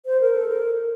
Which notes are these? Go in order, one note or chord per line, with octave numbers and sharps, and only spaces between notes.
C5
A#4
A4
A#4